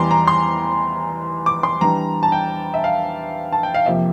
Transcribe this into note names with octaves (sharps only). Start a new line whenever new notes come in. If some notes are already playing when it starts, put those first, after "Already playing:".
Already playing: E2 E3 G3 A#5 C6 D6
A#5
C6
D6
C6
E3 G3 D4 A#5
A5
G5
E5
F5
A5
G5
F5
F2 C3 F3 A#3 E5